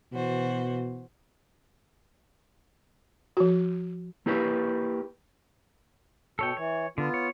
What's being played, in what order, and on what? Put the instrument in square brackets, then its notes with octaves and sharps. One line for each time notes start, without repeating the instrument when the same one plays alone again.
[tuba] B2 [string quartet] E3 F#4 C5
[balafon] F3 F#4
[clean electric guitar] A#3 E4 G4 B4
[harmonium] B2 [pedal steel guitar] A4 C#5 G5
[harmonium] E3 [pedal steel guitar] C#5
[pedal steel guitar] D3 [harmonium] B3 F4
[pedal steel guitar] C#5